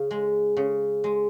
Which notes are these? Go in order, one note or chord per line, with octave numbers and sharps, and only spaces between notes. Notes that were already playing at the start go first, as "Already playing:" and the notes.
Already playing: C#3 F5
G#3
C#3
G#3